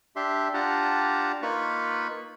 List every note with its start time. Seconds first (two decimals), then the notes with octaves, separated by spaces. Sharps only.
0.16 D4 G4 E5 C6
0.54 D4 F4 G4 F#5 A5 A#5
1.42 A#3 D#4 F4 B4 B5 C#6